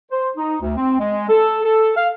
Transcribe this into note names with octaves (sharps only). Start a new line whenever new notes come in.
C5
D#4
D2
C4
G#3
A4
A4
F5